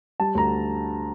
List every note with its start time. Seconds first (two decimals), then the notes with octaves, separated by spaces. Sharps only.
0.20 G3 A5
0.35 D2 A#5